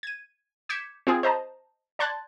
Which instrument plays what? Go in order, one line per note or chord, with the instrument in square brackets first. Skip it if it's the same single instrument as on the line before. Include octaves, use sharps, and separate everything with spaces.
[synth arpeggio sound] G#6 D#7
D6 G6 G#6 B6 C#7 E7
C4 F4 G#4
C5 D#5 A5 A#5
D5 A5 C6 F#6 G#6 A6